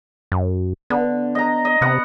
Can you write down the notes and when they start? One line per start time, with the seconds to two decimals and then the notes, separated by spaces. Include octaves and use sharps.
0.32 F#2
0.90 D3 B3
1.35 D#5 A#5
1.65 D#5
1.81 C3 B3 F#5